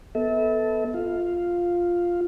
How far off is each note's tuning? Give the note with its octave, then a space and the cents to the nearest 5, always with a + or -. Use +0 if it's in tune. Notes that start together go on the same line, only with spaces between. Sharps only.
B3 +0 A4 +0 E5 -35
F4 +0 F5 +0